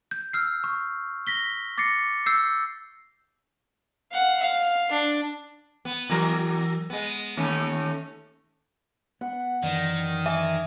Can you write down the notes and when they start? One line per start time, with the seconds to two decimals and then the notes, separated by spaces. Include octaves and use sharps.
0.11 G6
0.33 E6 F6 C7
0.64 C#6
1.27 A#6 B6 G7
1.78 D6 A6 A#6 C7 C#7
2.26 E6 G6 C7
4.11 F5 F#5
4.41 F5
4.92 D4
5.85 B3
6.10 E2 F#3 A#4
6.90 G#3 B3
7.37 D#2 A3 C#4
9.21 B3 F#5
9.64 F#2 D#3 E3 D5
10.26 E5 G#5